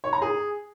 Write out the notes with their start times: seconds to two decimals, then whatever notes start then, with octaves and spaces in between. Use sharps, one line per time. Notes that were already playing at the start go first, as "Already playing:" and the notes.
0.04 C#5
0.13 A#5
0.22 G#4